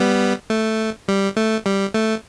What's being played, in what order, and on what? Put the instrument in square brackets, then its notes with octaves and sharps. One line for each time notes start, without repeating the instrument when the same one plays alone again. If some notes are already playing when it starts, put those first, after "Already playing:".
Already playing: [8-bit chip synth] G3 B3
A3
G3
A3
G3
A3